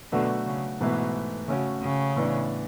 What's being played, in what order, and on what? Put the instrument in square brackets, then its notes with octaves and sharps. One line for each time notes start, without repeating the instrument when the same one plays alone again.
[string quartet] B2 D3 [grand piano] F#3 A3 D4 F#4 B4
[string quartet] C#3
[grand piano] G#2 E3 A3 E4 B4 [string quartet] B2
[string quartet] C#3 [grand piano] A3 C#4 F#4
[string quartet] C#3
[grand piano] A2 E3 B3 D4